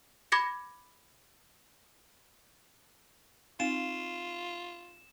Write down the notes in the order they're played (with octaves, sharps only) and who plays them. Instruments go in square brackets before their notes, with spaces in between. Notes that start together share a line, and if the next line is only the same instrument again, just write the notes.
[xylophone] B5 D6 G#6 A#6 C#7
[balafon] C4 D#4 F5 [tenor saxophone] F4 [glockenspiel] E7